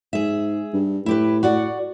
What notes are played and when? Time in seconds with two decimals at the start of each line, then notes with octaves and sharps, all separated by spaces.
0.13 G#2 G#4 E5
0.74 G2
1.06 A2 E4 G4 B4
1.43 F#4 D5 F#5